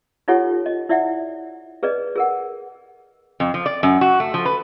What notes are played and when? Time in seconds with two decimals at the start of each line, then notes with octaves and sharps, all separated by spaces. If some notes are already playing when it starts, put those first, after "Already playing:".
0.28 D#4 F4 G4 A4 C#5 F#5
0.66 D#5
0.89 E4 D5 E5 F#5
1.83 G#4 B4 D5 D#5
2.15 G#4 A#4 F#5
3.40 F2
3.54 F3
3.66 D5
3.83 F#2
4.01 F#4
4.20 A3
4.34 F3
4.45 B4